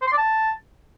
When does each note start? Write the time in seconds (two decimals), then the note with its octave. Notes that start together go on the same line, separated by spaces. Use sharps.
0.02 C5
0.07 C6
0.13 D5
0.18 A5